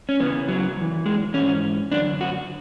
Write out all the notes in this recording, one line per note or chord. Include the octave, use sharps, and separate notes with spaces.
C#4
E2 C#3 E3 B3
F#3
F#2 E3
G#3
G#2 E3 C#4
F#2 D3 D4
F#4